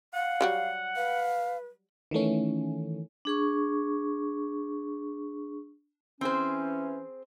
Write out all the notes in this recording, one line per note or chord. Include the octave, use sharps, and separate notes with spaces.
F5 F#5
F#3 G3 F#4
B4 F5
D#3 E3 A3 C#4
D4 G#4 C#6
E3 C4 C#4 G#4 C5